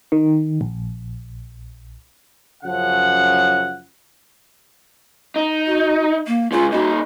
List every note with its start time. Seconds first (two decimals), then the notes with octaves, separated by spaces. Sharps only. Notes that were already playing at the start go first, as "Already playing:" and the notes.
0.12 D#3
0.61 A#1
2.63 F#2 C#3 F3 F#5
5.36 D#4
5.66 F#4
6.27 A#3
6.52 C#3 G#3 F4
6.72 A#2 D#4 F#4